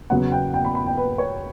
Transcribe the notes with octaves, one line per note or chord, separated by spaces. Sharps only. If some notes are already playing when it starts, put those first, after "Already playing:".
E2 C#3 F#3 B3 F#5
G5
G5
B5
B5
G5
B4
C#5